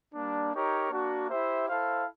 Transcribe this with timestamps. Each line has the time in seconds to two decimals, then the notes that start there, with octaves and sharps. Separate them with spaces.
0.14 G3 A#3 D4
0.52 D#4 G4 A#4 C#5
0.91 A#3 D4 F#4
1.30 E4 G4 C5 E5
1.68 E4 A4 C5 F5